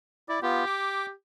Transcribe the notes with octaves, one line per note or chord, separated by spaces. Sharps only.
E4 D5
B3 F4 G4
D6